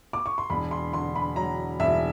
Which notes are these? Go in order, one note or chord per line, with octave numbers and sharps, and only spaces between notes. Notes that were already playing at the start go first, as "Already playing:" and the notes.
D6
C#6
C6
E1 B5
C6
D3 C6
B5
F#3 A#5
E1 E5